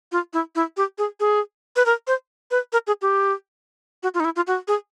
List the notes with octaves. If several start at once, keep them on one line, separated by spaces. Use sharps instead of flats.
F4
E4
E4
G4
G#4
G#4
B4
A#4
C5
B4
A#4
G#4
G4
F#4
F4
D#4
E4
F4
F#4
G#4